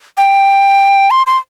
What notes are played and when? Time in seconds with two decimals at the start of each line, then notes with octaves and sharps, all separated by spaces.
0.18 G5
1.11 C6
1.27 C6